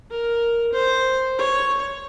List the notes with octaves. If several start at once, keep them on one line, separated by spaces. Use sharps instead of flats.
A#4
C5
C#5